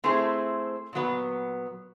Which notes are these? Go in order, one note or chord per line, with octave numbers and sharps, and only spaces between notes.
A3 C4 E4 G#4 C5
A#2 F#3 B3